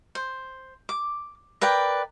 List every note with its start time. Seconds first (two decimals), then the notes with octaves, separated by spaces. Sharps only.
0.15 C5
0.89 D6
1.61 A#4 B4 D5 G5